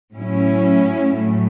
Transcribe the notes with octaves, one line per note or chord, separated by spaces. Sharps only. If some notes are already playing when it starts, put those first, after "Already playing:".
A2 F#3 C#4 E4
A2 F#3 A3